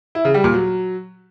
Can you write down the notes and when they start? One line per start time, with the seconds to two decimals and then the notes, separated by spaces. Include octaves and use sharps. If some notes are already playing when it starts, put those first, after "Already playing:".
0.15 E4
0.25 C#3
0.34 G3
0.44 A#2
0.54 F#3